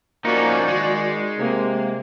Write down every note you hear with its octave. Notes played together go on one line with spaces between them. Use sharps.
F3 A#3 C#4 D#4 F#4 D5
D#3 G#3
C3 A#3